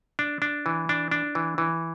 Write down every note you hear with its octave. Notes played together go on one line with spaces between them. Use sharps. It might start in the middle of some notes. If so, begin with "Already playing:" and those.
D4
D4
E3
D4
D4
E3
E3